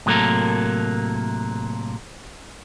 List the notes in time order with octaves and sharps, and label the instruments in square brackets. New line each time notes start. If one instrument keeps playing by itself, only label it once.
[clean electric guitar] A2 C3 F#3 A#3 A4 A#4